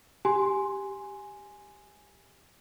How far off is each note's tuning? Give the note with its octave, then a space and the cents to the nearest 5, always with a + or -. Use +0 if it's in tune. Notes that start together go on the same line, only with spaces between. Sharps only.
G4 +0 G#5 +0 C6 +0